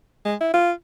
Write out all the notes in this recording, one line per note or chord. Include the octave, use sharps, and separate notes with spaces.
G#3
E4
F4